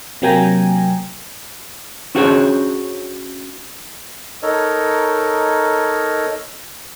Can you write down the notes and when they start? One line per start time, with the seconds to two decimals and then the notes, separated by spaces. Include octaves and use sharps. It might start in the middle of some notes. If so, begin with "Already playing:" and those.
0.22 C3 F#3 A#3 G5 G#5 A#5
2.15 C#4 D4 F#4 G#4 C5 C#5
4.42 D#4 A4 A#4 C#5 D#5